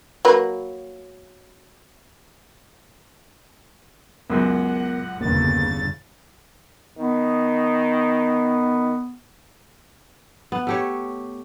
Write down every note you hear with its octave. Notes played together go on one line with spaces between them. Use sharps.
F#3 A#3 B4
C#2 F#2 B3 A#4 F#5
G1 E2 C#3 A#3 A6
D#3 B3
B3
A3 G4 C#5